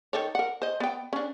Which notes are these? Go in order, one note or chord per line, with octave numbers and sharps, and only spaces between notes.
D#3 A4 C#5
A#4 F#5
C5 D#5
B3 G5
C#4 D4